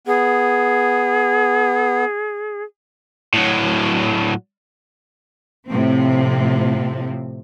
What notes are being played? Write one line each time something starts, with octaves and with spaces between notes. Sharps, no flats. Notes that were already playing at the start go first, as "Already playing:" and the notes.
B3 G#4
A2 F#3
A2 C3 F3 C4